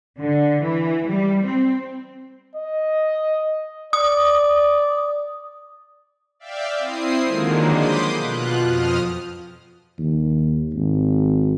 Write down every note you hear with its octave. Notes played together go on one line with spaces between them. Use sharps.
D3
E3
G3
C4
D#5
D5 D#6
D5 E5 F5 G5
C4 E4 D#6 C7
D3 D#3 F3 F#3 G#3 A#3
B5 C6 D6 D#6 G6
B2 F4 F#6
F2 F3 D#6 F6
D#2
G#1